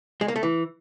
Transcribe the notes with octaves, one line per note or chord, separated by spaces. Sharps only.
G#3
A#3
A3
E3